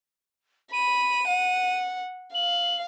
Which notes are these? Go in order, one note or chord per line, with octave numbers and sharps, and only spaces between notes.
B5 D#7
F#5
F5 F#7